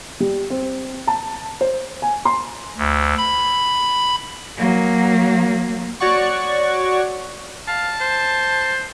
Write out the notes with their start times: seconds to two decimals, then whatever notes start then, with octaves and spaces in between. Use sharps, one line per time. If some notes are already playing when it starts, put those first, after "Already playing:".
0.20 G3
0.50 C4
1.07 A5
1.61 C5
2.02 G#5
2.25 C6
2.77 D2
3.18 B5
4.57 F#3 A#3
6.00 F#4 C#5 D5 F#5 C#6
7.68 F5 A5
8.01 C5